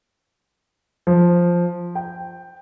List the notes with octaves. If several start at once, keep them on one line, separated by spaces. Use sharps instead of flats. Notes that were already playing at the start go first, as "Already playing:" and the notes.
F3
G5